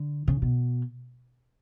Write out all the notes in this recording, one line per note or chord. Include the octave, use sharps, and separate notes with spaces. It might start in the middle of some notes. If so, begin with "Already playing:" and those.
Already playing: D3
C#3
B2